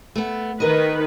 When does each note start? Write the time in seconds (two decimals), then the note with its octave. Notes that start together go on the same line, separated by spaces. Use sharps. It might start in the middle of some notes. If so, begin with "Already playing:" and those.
0.16 A3 B3
0.60 D#3 A#4 B4 D#5